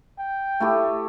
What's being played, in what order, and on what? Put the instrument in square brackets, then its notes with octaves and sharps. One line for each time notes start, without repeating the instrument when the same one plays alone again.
[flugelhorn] G5
[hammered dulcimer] A3 E4 G4